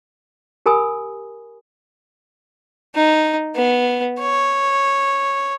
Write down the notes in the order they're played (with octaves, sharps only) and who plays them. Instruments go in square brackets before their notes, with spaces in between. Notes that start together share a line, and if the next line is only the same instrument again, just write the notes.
[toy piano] G4 A#4 G#5 B5 D#6
[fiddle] D#4
B3
C#5